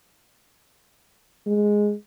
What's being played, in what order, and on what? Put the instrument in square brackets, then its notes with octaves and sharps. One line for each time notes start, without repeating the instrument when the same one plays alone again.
[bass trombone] G#3